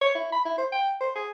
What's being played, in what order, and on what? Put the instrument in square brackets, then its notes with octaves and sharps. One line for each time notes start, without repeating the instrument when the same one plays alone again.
[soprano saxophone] C#5
E4
B5
E4
C5
G5
C5
G#4